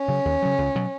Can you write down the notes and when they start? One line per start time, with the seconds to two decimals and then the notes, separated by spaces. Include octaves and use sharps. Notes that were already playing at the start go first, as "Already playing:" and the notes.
Already playing: C#4
0.08 C#3 F#3
0.25 D#2
0.42 C#3 F#3
0.58 C#2
0.75 B2 F#3